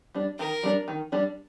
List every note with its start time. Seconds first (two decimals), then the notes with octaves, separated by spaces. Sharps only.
0.14 G3 D4
0.39 D#3 A#4
0.63 G3 D4
0.88 D#3
1.12 G3 D4